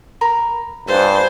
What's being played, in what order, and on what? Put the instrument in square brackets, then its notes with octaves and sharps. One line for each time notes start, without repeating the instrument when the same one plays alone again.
[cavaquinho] A#4 A#5 B5
[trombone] G2 [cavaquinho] F4 F#5 [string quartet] C5 G#5 A6